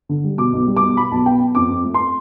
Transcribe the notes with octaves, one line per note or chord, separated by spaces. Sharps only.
D3
G3
B2 D6
B1
G3
D6
B1
B2 B5
B1 A5
B3 G5
B3
F2 D6
F2
A3
C6